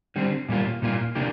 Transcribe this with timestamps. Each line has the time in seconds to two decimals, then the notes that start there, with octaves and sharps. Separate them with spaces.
0.16 D3 G3 C4
0.49 A#2 G3 A#3 F4
0.82 A#2 G3 A#3 F4
1.15 C3 A#3 D4 G4